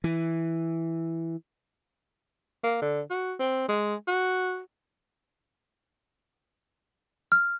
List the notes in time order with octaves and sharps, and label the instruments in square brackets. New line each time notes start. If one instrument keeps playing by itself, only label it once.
[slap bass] E3
[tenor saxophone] A#3
D3
F#4
C4
G#3
F#4
[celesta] F6